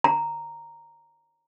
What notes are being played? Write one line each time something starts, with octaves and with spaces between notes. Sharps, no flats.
A#5